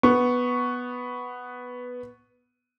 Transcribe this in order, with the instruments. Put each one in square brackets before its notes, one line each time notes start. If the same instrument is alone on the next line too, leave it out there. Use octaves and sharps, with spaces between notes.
[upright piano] B3 C#6